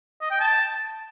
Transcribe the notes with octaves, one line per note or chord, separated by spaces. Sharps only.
D#5
G5
A5